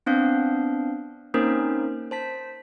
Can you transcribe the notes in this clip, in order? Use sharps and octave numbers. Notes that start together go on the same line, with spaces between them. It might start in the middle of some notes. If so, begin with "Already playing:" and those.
B3 C4 D4 F5
A#3 C4 C#4 D#4 A#4 C5
C5 A5 B6